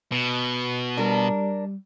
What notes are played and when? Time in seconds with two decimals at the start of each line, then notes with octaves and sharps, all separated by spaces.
0.12 B2
0.97 G3 D4 A#4